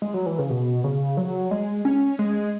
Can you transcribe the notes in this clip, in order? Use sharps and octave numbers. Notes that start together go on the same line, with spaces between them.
G#3
F#3
E3
C#3
B2
C#3
F#3
G#3
C#4
G#3